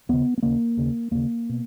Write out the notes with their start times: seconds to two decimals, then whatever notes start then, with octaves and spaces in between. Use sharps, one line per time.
0.09 D#2 C#3 B3
0.38 B3
0.43 D#2 C#3 A#3
0.77 D#2 C#3
1.11 D#2 C#3 A#3
1.49 B2